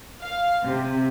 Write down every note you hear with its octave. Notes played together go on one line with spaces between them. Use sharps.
F5
C3